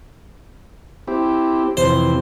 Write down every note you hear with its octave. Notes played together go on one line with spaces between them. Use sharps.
C4 E4 G4
F2 C3 E3 C5